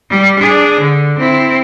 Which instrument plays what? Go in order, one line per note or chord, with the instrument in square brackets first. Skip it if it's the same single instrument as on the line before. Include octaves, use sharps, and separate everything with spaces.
[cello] G3
D4 G#4
D3
C4 E4